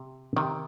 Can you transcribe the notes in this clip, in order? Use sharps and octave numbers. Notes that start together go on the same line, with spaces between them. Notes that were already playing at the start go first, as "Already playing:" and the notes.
Already playing: C3
C3 D#3